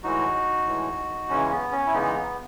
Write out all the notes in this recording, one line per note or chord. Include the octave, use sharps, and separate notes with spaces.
A2 E3 G#3 D#4 F#4
A2 E3 G#3
C#3 E3 G#3 C#4
B3
C#4
E4
C#3 E3 G#3 B3 D#4
B3